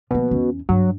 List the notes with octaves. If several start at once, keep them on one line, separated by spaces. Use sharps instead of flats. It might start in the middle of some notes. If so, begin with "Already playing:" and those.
B2 F3 A#3
E2 C#4
G2 F#3